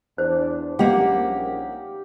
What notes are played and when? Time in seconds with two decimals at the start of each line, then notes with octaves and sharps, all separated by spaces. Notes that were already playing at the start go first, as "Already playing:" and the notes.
0.18 E2 D4 C5
0.79 A#1 A#3 C#4 D#4 G4 F#5